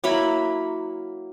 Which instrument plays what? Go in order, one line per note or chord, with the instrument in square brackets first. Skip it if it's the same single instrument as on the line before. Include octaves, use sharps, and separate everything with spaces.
[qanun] F#3 A#3 E4 B5